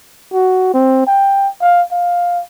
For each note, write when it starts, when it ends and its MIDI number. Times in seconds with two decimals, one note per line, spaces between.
0.33 0.69 66
0.74 1.03 60
1.07 1.48 79
1.61 1.82 77
1.92 2.41 77